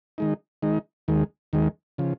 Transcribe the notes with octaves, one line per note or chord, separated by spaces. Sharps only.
D#3 G#3 D#4
D#3 G#3 D#4
D#2 D#3 G#3
D#2 D#3 G#3
C#3 F3